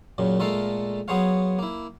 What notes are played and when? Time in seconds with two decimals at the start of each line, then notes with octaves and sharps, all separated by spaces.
0.18 F#2 A#2 C#3
0.40 A#2 G#3 A3 A4 A#4 F5
1.08 F#3 B3 G#4 C5 C#5 F5
1.59 A#3 E4